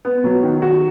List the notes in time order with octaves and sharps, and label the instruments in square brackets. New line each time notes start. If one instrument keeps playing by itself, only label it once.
[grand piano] B3
F#3
D#3
F#4